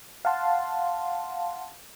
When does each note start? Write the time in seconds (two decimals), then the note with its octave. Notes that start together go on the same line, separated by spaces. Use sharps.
0.25 F5 F#5 A5 C6